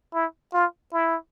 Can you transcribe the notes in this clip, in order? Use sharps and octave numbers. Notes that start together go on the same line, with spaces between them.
E4
F4
E4